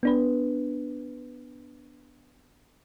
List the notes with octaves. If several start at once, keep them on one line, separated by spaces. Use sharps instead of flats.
B3 D4 B4